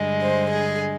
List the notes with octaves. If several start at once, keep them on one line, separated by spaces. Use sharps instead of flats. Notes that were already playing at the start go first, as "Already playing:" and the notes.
Already playing: G2 D3 G#3
C5
G#4